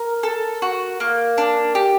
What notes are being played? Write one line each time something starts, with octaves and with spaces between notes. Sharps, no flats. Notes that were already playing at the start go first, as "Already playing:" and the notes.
Already playing: A#4
A4
F#4
A#3
D4
G4